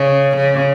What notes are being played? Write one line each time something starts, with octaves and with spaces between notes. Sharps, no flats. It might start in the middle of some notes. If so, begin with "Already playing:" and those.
Already playing: C#3
C#3